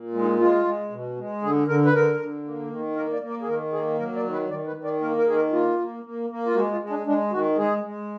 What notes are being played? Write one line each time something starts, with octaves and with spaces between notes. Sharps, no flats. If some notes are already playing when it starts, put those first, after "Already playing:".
Already playing: A#2
G#3
D#4
G#3 F4
G#3
B2
G#3
D3 G#4
D3 A#4
B4
D3 A#4
D3
A#3
D#3
A#3 A#4
D5
A#3
D5
G#4
D#3 A#4
A#3 G#4
F#3 A#4
D5
D#3
B4
D#3 D5
B4
D#3
D5
A#3 A#4
A#4
D#3 G#4
A#4
A#3 F4
A#3
A#3
A#3
F4
G#3 F#4
F4
G#3
D4
G#3 D4
D#3 F#4
G#3 G#4
G#3